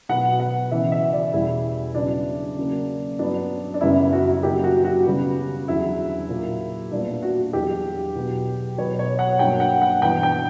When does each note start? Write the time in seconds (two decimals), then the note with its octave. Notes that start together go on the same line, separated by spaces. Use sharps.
0.09 B2 F#3 B3 F#5
0.40 F#5
0.71 C#3 E3 B3 E5
0.92 E5
1.13 D5
1.33 E2 B2 G3 E4
1.94 C#3 F#3 B3 D4
2.57 C#3 F#3 A#3
3.19 G2 F#3 B3 D4
3.74 D4
3.81 F#2 C#3 G3 B3 E4
4.13 F#4
4.43 C#3 F#3 A#3 G4
4.64 F#4
4.85 F#4
5.06 C#3 G3 B3
5.68 E2 D3 F#3 E4
6.29 A#2 F#3 A#3
6.91 A#2 G3 B3 D4
7.22 F#4
7.53 E2 D3 F#3 G4
8.16 B2 F#3 B3
8.78 B2 F#3 B3 C#5
8.99 C#5
9.19 F#5
9.39 G2 F#3 A#3 G5
9.60 F#5
9.82 F#5
10.02 G2 E3 B3 G5
10.23 G5